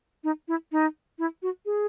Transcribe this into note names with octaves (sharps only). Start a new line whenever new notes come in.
D#4
E4
D#4
E4
F#4
G#4